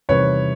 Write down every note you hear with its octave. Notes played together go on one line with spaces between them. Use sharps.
E2 C3 D#3 G3 C4 B4 C#5